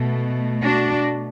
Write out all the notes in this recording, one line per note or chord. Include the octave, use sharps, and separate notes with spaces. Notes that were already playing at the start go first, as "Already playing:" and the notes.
Already playing: B2 A3
D4 F#4